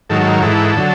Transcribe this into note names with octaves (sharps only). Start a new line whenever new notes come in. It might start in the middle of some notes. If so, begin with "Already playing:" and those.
G#2 D#3 F#3 A4
A4
A#4
G#2 E3 A4
D3 F#3